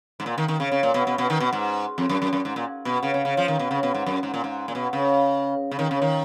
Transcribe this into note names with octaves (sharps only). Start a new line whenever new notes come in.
G#2
A#2
D#3
D#3
C#3
C#3
A#2
B2
B2
B2
D#3
B2
G#2
F2
F#2
F#2
F#2
G#2
A#2
B2
C#3
C#3
C#3
F3
D#3
B2
C#3
B2
G#2
F#2
G#2
A#2
G#2
A#2
B2
C#3
C#3
D#3
C#3
D#3